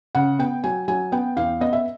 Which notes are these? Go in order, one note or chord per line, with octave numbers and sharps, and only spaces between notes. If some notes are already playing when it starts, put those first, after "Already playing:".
C#3 F#5
B3 G5
F#3 G#5
F#3 G#5
B3 G5
E2 F5
B3 D#5
E5